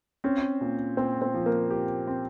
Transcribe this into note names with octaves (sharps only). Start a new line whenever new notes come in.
C4 C#4
A#2
A#2 C4
C4
F3
A#3
G4
C4